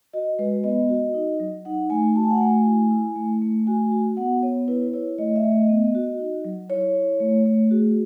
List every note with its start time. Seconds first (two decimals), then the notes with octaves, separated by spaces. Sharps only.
0.13 F#4 D#5
0.39 G#3 B4
0.64 B3 D#5
0.89 F#4
1.14 D#4
1.40 F#3
1.65 D#4 F#5
1.90 A3 G#5
2.16 F#4 A5
2.23 G#5
2.30 F#5
2.37 A3 G#5
2.65 E4
2.91 E4
3.16 A3
3.42 A3
3.67 F#4 G#5
3.92 F#4
4.17 B3 F#5
4.43 B3 C#5
4.68 E4 B4
4.94 E4 C#5
5.18 A3 D#5
5.36 E5
5.43 A3
5.52 D#5
5.69 B3
5.95 F#4
6.19 D#4
6.44 F#3
6.70 E4 C#5
6.95 E4
7.20 A3
7.46 A3
7.71 F#4 G#4